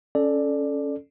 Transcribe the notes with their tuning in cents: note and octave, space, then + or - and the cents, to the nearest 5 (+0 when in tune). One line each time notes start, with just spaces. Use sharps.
C#4 +0 A4 -10 D5 +10